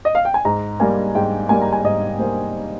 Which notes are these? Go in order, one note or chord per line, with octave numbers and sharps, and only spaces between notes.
D#5
F5
G5
G#5
G#2 A#5
G3 A#3 G#5
G#2 G5
G3 A#3 G#5
A#5
G#5
G#2 D#5
G3 A#3 C5